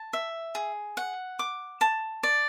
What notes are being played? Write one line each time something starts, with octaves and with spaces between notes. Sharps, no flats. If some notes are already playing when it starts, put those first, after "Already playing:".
Already playing: A5
E5
G#4
F#5
D6
A5
D5